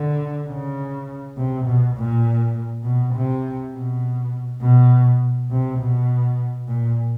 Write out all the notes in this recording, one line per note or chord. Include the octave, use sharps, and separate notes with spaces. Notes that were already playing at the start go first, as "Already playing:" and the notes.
Already playing: D3
C#3
C3
B2
A#2
B2
C3
B2
B2
C3
B2
A#2